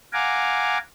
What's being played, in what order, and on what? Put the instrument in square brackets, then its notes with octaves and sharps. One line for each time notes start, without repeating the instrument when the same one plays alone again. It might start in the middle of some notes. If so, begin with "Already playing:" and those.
[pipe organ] F5 F#5 G#5 A#5 D6